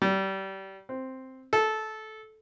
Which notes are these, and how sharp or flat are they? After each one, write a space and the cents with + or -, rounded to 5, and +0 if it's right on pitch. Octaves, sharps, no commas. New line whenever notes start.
G3 -25
C4 +0
A4 -15